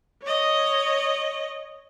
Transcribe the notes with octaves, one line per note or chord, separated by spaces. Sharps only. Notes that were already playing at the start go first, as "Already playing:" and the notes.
C#5 D#5